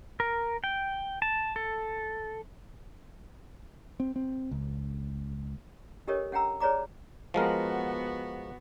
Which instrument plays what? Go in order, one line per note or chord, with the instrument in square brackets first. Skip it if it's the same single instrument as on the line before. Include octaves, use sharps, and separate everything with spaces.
[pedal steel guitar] A#4
G5
A5
A4
[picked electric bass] C4
C4
C#2
[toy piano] D4 G4 A4 A#4 C#5 D#5
C#4 F#5 G5 A#5 E6
G#4 B4 C#5 D5 A#5 D6
[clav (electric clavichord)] F3 G#3 A#4 [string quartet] B3 F#4